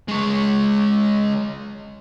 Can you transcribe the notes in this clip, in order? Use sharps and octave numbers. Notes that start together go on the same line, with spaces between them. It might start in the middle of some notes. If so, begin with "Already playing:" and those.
G#3 C#5